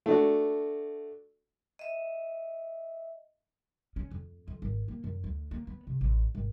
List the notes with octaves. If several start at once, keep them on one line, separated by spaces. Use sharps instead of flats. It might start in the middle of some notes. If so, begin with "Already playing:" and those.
A3 D4 F#4
D#5 E5
C#4
F2
F2
G#1
A#3
F#2
D2
A#3
B3
C3
A1
G#1